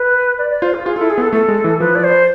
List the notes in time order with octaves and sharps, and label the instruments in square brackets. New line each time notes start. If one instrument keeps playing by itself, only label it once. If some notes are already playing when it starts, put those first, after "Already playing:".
Already playing: [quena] B4
D5
D5
[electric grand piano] F4 [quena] C5
[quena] F4
[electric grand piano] F4 [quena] G#4
[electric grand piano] E4 F4 [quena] A4
[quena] G#4
[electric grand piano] B3
[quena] A4
[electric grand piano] A3 [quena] A4
[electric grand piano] G#3
E3
[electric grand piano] F3 [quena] B4
[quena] D5
C5